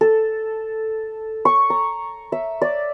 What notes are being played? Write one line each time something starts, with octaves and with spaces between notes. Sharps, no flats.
A4
C#6
A#5
E5
D5